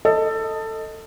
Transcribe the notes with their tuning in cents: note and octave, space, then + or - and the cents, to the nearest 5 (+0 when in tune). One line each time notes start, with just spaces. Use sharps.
A4 +15 D#5 +0